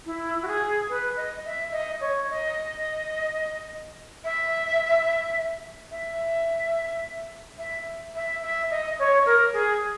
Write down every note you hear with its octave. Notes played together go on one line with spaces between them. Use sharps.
E4
F#4
G#4
B4
D#5
E5
D#5
C#5
D#5
E5
E5
E5
E5
E5
D#5
C#5
A#4
G#4